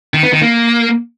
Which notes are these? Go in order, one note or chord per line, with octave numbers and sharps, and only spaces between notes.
D#3
B3
D#3
A#3